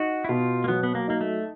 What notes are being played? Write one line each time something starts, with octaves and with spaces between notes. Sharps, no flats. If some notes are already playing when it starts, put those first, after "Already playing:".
Already playing: D#4 F#4
E4
B2 F4
A#3
F#3 B3
B3
A#3
A#3 D#4
A3